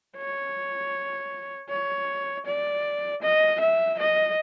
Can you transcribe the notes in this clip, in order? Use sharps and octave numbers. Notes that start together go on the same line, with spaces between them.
C#5
C#5
D5
D#5
E5
D#5